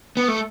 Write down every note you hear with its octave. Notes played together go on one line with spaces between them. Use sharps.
B3
A3